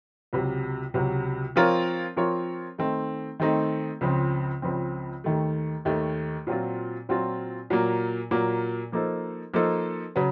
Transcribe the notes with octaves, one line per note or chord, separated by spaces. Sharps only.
C#2 C3 F#3
C#2 C3 F#3
F3 C4 F4 A#4 C#5
F3 C4 F4 A#4 C#5
D#3 A3 C4 D#4
D#3 A3 C4 D#4
C#2 C#3 F3 C4
C#2 C#3 F3 C4
D#2 D#3 A3
D#2 D#3 A3
A#2 F#3 C4 F4
A#2 F#3 C4 F4
A#2 F#3 A#3
A#2 F#3 A#3
F3 A#3 D#4 A4 C5
F3 A#3 D#4 A4 C5
C#3 F#3